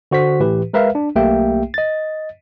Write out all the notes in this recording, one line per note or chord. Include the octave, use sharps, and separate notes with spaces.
D3 F#4 C5 B6
A2 E3 G4 B4
G#3 A#4 B4 E5 F5
D4
B1 A3 A#3 G4 E5 G5
D#5 A6